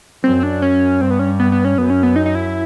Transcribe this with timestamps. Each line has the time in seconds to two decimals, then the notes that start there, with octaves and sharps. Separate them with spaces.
0.24 F#2 C4
0.43 D4
0.62 C#4
1.01 G2 C4
1.11 B3
1.19 C#4
1.39 B3
1.52 B3
1.65 C#4
1.78 F#2 B3
1.90 C#4
2.03 B3
2.16 D#4
2.26 D#4
2.35 E4